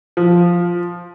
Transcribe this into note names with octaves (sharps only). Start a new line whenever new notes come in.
F3